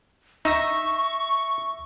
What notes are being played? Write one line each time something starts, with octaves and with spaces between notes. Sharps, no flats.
D#4 E5 C#6 E6 A#6